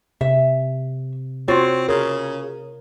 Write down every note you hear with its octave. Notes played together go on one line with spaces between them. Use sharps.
C3 E5
C4 F4 F#4 C#5
C#3 A#4